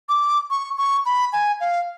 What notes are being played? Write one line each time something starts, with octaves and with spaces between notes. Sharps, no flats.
D6
C#6
C#6
B5
G#5
F5